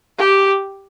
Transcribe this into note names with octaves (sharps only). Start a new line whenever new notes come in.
G4